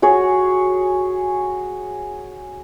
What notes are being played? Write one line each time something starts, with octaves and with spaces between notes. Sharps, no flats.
F#4 G#4 C#5